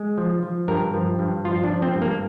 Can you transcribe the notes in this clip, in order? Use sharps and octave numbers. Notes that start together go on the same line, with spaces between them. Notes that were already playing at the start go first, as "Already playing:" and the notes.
Already playing: G#3
F3
F3
G2 A#4
F3
G2
F3 F4
D4
F3
C4
G2
A#3